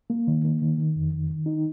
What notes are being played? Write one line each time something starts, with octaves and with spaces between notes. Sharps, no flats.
A#3
D#3
A#3
D#3
D#3
F2
D#3
D#3
D#4